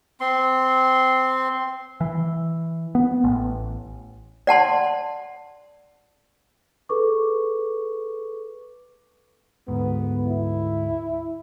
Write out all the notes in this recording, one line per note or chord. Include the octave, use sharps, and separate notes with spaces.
C4 C6
E3
B3
A1
D5 F#5 A5 C6
G#4 A4 B4 C#6 D6
D2 G#2 B3
E4